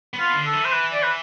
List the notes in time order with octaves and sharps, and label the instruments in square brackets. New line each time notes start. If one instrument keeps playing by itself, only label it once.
[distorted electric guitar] B3
[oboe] F4
[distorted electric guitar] D3
[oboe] A4
[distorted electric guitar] E3
[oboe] C5
B4
D5
B4